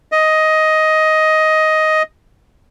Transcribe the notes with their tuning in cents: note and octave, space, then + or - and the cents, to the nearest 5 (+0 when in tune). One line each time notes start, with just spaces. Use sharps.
D#5 +10